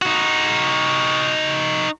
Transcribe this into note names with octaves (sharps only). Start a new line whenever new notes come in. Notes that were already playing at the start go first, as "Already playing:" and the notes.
D#4 F#4